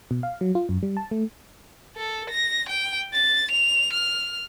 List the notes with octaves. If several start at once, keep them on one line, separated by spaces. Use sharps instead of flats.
B2
F5
F#3
F4
F#2
G3
A5
A3
A4
A#6
G5
A6
F7
F6